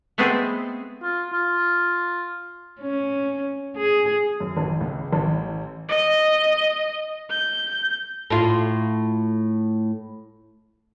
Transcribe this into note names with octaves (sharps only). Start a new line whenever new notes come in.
G#3 A3 B3 C4 G#4 A4
F4
F4
C#4
G#4
F#2
A1
C#2
A1
D#5
G6
A2 F4